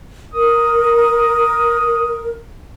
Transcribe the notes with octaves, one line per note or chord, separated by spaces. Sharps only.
A#4 D#6